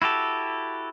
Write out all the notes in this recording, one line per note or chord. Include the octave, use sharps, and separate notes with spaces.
E4 F#4 G4 A4